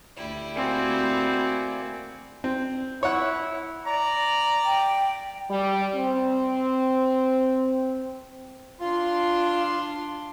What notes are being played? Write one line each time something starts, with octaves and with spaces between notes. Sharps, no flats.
D2 G3 E4
A#3 C4 F#4 D5 G#5
C4
E4 C#5 F#5
D5 A#5
G5
G3
C4
D4 F4 C6